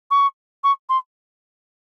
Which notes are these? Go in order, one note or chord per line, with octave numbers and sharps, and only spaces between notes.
C#6
C#6
C6